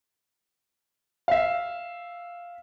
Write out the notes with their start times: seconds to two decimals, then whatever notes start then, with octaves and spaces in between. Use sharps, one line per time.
1.28 E5 F5